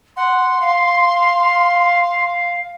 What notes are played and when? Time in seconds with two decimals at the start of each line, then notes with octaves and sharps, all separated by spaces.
0.17 F#5 C6
0.61 F5